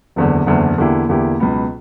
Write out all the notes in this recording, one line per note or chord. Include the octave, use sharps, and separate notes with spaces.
F#1 E2 D3
F#1 E2 D3
E2 D3 A#3 E4 G4
E2 D3 A#3 E4 G4
C#2 B2 F#3 B3 F#4